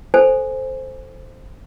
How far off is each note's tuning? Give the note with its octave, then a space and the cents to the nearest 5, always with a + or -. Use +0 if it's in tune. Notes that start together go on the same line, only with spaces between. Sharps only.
A4 +0 C5 +0 G#5 +0